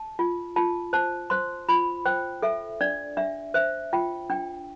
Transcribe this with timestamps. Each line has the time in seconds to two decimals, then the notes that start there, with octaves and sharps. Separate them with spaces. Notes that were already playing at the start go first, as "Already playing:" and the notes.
Already playing: A5
0.19 F4
0.56 F4 A5
0.93 C5 A5
1.30 C5 C6
1.69 F4 B5
2.06 C5 G5
2.43 A4 E5
2.81 D4 D5
3.17 D4 E5
3.54 C5 E5
3.93 F4 G5
4.30 D4 G5